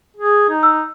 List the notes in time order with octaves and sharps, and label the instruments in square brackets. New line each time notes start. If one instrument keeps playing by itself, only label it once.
[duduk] G#4
D#4
[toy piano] E6